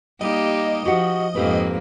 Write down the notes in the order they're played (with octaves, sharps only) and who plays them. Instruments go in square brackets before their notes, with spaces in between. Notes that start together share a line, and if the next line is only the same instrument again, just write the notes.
[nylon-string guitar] G3 [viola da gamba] A#3 D#4 G4 [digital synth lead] D#5
[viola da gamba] F3 [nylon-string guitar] F#4 G4 F#5
[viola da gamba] F2 G#2 A#3 [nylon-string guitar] C4 G4 B4